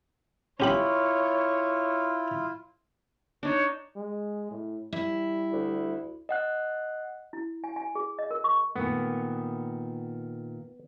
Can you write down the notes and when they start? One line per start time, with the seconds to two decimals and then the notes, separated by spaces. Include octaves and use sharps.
0.60 C#4 E4 F4 G4 C#5 B5
3.43 D4 D#4 C#5
3.96 G#3
4.51 A2
4.93 G3 E4
5.53 D2
6.29 D#5 F#5 F#6
7.33 E4
7.64 G#5
7.76 G#5
7.95 G#4
8.19 D#5
8.31 A#4
8.44 C#6
8.75 A#2 D#3 A3 B3